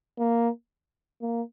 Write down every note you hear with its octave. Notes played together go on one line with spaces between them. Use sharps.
A#3
A#3